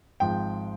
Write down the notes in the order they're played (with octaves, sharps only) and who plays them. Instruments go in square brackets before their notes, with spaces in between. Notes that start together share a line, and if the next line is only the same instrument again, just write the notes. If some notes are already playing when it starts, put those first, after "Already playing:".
[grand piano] G#1 G#2 F3 G5